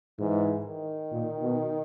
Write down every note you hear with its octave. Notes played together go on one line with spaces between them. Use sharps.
G#2 E3
D#3
A#2
B2